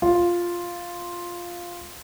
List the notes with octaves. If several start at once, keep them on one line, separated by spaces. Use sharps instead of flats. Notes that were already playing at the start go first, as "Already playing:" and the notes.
F4